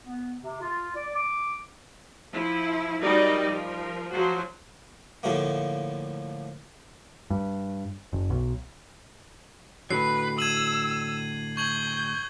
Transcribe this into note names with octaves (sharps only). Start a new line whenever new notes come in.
B3
C3
F4
D5
D6
F3 E4
F#3 G3 D#4 A#4 D5 D#5
F3 A#4
F3 F#3 F#4 C5
A2 D3 F3 A3 A#3
G2
F#1
B1
A2 D3 F#3 B4 C7
E6 G#6 D#7 F#7
C#6 G6 G#6 F#7